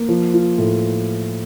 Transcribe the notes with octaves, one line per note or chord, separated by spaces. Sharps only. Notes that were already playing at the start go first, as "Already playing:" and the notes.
Already playing: A#3
F3
F4
A2